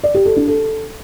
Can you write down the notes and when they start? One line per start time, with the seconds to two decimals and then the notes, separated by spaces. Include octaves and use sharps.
0.03 D5
0.14 G4
0.25 A4
0.36 D4
0.47 A4